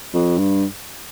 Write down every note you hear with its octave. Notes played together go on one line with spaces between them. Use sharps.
F2
G2